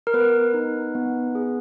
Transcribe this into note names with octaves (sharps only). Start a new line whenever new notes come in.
A#4
B3 B4
D#4
B3
G#4